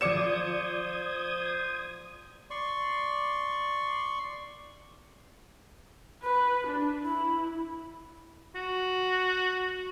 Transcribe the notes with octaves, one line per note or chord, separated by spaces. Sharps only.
F3 C5 D5 D6 D#6 G#6 C#7 E7
D5 C6 C#6
B4 B5
D4
E4 B5
F#4